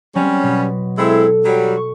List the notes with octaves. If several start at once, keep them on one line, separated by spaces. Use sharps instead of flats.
F#3 G3 C4 C#4
B2 B6
G#3 C4 E4 A4
F#3 G3
C#6